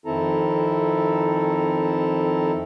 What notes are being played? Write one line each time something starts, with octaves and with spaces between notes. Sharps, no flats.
F2 D#3 C4 E4 A4 A#5